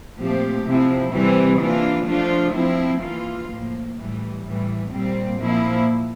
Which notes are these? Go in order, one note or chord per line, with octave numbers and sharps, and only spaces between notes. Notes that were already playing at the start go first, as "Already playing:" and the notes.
A#2 F3 A3 C4 G4
C3 F3 C4 E4
C3 E3 G3 C4
E3 A#3 D4 F4
F3 A3 D4 F4
F3 C4 E4
E3 A#3 F4
A2 F3 A#3
A2 E3 G3
A2 E3 G3
A#2 G3 C4
A#2 F3 A#3 E4